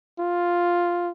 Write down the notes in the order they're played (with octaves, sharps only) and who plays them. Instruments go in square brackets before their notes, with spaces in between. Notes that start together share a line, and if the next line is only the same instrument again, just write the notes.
[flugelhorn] F4